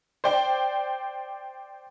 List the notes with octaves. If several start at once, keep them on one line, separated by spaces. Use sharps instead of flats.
C5 D5 G5